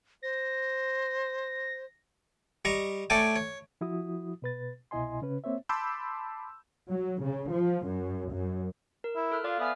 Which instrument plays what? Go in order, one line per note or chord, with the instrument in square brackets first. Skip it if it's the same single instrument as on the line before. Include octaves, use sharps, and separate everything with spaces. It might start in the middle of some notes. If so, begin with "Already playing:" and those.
[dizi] C5 [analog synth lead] A#6
[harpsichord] G3 D#5 A#5 C#6
A3 A4 C#5 D5 G5 G#5
C#5
[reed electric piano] F3 E4 F#4 D#6
B2 B4 A6
C2 B2 E4 D#5 G#5 C6
C#3 C#4 B4
A#3 C4 C5 C#5 E5
[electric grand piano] A5 B5 C6 D6 E6 G6
[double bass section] F#3
C#3
F3
F#2
F#2
[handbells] A#4
[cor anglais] E4
[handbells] A4 F6 F#6
[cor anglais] F4 [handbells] D5 F5 D6
[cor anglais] B3 [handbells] E5 G#5 F6